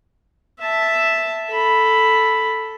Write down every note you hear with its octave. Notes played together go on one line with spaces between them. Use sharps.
E5 A5
A4 B5